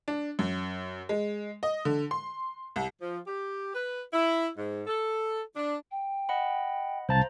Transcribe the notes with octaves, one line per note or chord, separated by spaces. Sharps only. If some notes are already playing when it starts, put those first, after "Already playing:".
D4
F#2
G#3
D#5
D3
C6
C2
F3
G4
B4
E4
G#2
A4
D4
G5
D#5 F#5 B5
C2 C5 F5 A5 A#5 A6